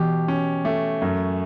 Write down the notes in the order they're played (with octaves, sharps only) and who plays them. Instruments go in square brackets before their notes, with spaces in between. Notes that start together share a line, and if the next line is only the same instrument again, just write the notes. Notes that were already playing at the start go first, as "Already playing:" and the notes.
Already playing: [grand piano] B2 G4 [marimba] E3
[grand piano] C#4
A3
F#2